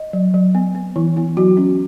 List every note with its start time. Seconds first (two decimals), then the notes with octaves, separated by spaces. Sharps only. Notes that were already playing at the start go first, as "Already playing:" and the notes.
Already playing: D#5
0.13 F#3
0.34 F#3
0.55 B3
0.75 B3
0.96 E3 E4
1.16 B3 E4
1.37 F#3 F#4
1.57 C#4